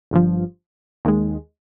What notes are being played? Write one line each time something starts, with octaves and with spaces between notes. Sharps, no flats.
G1 G2 F3
D#2 D#3 G#3